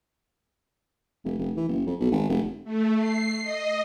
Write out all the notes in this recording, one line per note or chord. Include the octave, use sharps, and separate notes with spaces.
F1
F1
E3
F#1
F2
B1
G#1
F1
A3
C7
D#5